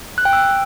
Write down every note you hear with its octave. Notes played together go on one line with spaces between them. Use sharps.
F#6
G5
E6